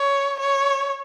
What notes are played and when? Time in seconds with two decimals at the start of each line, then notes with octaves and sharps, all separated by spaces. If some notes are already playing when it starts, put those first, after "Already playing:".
Already playing: C#5
0.40 C#5